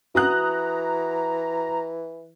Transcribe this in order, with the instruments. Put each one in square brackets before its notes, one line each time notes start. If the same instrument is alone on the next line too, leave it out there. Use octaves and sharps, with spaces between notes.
[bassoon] E3 [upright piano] F#4 D#6 F#6 [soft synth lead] A#5